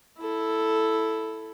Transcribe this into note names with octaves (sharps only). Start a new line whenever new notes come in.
E4 A4